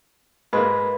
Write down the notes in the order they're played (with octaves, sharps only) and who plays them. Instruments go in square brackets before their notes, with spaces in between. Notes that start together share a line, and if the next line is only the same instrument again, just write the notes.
[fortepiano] G#2 G#3 A#3 [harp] B4